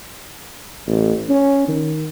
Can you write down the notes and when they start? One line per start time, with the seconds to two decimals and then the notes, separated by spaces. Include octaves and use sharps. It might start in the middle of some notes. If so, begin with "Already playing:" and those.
0.87 A1
1.29 C#4
1.68 D#3